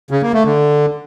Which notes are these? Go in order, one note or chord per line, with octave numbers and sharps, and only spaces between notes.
C#3
A#3
A3
D3